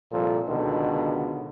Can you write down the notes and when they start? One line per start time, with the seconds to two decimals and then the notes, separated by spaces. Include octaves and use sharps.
0.11 C2 A#2 F3 A4
0.48 C#2 B2 D3 D#3